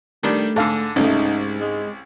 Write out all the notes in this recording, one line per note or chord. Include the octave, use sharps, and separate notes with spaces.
D#3 G3 A3 D4
G#2 D3 A4 F5
C2 G#2 C#3 A3 C#4 D#4
G#3